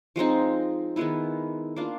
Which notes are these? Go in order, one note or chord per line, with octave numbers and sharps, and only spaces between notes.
F3 G#3 C4 D#4
D#3 G#3 B3 E4
A#3 D4 F4